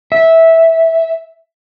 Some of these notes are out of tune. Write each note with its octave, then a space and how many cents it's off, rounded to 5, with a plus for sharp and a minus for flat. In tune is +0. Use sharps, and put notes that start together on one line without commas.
E5 -10